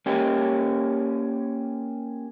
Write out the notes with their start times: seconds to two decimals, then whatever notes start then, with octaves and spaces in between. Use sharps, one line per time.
0.06 A#3 C#4 G4